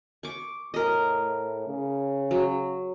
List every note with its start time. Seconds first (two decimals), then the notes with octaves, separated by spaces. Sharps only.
0.23 C#6 D6
0.74 A2 A#4 D#5
1.67 C#3
2.31 F#3